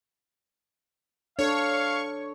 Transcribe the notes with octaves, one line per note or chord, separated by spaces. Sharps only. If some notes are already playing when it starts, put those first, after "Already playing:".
D4 A4 C#5 F5 C#6